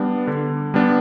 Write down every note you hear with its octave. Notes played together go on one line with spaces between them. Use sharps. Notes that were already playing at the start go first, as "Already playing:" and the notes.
Already playing: G3 B3 D4
D3
G3 B3 D4